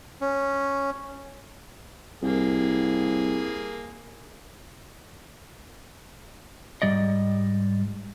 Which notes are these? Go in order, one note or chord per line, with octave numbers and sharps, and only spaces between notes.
C#4
C2 A#3 G#4
G#2 G3 D5 D#5